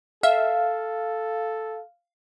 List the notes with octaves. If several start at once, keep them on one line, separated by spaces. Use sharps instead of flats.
A4 E5 F5